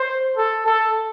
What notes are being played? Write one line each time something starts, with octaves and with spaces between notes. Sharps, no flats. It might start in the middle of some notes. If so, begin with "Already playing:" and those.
Already playing: C5
A4
A4